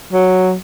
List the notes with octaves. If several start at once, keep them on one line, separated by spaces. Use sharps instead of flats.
F#3